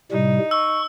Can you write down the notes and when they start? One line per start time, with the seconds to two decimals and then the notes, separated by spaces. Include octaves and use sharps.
0.12 A2 C3 G3 D#4
0.51 C#6 E6